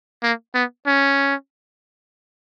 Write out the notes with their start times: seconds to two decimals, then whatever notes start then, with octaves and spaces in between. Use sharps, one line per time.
0.23 A#3
0.54 B3
0.86 C#4